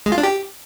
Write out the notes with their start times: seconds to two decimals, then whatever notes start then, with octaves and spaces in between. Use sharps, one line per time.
0.06 G#3
0.12 F4
0.18 D4
0.23 G4